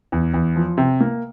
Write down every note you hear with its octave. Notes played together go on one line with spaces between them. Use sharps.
E2
E2
F3
C3
A#3